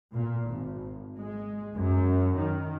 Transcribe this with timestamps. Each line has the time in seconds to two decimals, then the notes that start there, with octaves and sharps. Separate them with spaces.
0.13 A#2
0.48 G#1
1.19 G#3
1.76 F#2
2.37 D#3